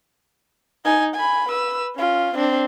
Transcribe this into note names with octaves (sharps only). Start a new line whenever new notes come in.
D#4 G#5
G#5 B5
B4 E6
C#4 F4
C4 D4